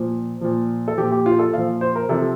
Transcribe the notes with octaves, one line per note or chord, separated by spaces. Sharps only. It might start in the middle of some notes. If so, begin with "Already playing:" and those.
Already playing: A#2 F3
A#2 F3
A4
A#2 F3 G4
G4
F4
A4
A#2 F3 F5
C5
A#4
C3 F3 A4